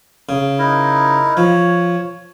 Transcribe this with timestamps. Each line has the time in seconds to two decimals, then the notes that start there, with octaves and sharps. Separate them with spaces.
0.29 C#3
0.59 D#4 E4 A#4
1.37 F3 C#5